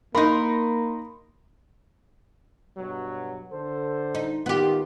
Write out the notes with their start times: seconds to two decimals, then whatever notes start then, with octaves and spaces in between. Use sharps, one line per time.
0.15 A#3 D#4 A#4 B5 C6
2.78 G2 B2 F#3
3.52 D3 A4 C5
4.15 D#4
4.46 D#3 B3 F4 G4